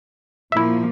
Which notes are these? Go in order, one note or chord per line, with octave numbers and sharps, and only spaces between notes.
A#2 F3 A#3 E4 E5